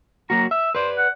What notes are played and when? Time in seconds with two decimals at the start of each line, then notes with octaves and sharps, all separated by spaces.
0.30 F#3 A#3 F#4 A#5
0.51 E5 E6
0.75 B4 C5 D5
0.98 F#5